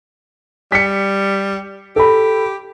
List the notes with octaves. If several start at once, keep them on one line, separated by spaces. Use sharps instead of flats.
G3 B6 C#7
G4 A4 B5